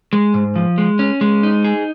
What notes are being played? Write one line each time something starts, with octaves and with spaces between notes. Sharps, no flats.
G#3
G#2
F3
G#3
C#4
G#3
D#4
G#4